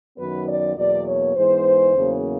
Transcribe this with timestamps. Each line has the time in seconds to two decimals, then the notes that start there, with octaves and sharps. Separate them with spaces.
0.17 F#2 D#3 F#3 B3 B4
0.47 D5
0.76 E2 B2 F#3 A#3 D5
1.06 C#5
1.34 G#2 E3 G#3 B3 C5
1.94 E2 C#3 F#3 A#3